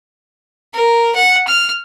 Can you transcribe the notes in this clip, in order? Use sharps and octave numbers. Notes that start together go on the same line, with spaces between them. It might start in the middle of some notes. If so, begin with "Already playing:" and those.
A#4
F#5
F6